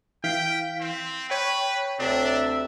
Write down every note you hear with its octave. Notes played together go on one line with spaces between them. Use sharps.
E3 F5 G5 B6
C4
B4 C#5 G5
D2 C3 D4 E5